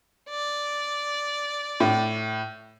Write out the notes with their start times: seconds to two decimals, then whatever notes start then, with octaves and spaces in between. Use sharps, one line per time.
0.29 D5
1.80 A2